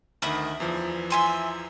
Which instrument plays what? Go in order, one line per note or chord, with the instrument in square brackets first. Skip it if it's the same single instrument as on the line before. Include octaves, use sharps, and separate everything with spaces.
[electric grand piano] D2 D#3 [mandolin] E5 B5 D#6
[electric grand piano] E2 E3 F3
[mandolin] E5 G#5 C6